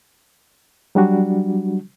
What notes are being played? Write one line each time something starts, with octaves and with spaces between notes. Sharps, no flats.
F#3 G3 D4 F#4